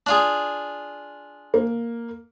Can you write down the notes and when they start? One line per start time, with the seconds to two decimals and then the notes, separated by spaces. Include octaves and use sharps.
0.06 D4 F4 G#4
1.54 A#3